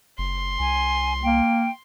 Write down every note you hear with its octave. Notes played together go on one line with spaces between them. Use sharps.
F#1 C6
C2 G#5
A#3 G5